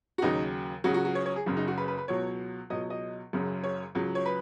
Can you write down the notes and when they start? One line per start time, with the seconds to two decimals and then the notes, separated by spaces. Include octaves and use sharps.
0.18 F#4
0.22 D#2 C#3 F#3 D#4
0.84 C#2 C#3 F#3 F#4
0.94 F#4
1.05 F#4
1.15 C#5
1.26 C#5
1.36 G#4
1.46 F#1 F#2 C#3 F#3
1.57 D#4
1.68 F#4
1.78 B4
1.88 B4
1.98 B4
2.08 C#2 B2 F#3 C#5
2.70 C#2 B2 F#3 D#5
2.90 D#5
3.33 F#1 F#2 C#3 F#3
3.64 C#5
3.95 C#2 C#3 F#3
4.15 C#5
4.26 B4